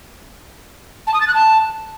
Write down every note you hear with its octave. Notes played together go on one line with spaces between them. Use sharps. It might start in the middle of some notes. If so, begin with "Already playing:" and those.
A5
D#6
A6
F#6
A5